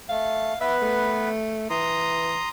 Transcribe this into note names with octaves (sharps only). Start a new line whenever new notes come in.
A3 F5
B3 B4 E5
A3
E3 A#5 C6 D#6